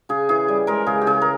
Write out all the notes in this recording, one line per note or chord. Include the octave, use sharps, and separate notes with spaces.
C#3 G#4
E3 G#4
G3
G#3 A#4
C#3 G#4
G4
C#3 G#4
A#4